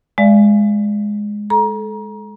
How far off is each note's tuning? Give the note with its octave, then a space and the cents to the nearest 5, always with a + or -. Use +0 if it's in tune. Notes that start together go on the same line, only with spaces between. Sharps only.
G#3 +0 D5 +0 F5 -45
A4 -20 A#5 +25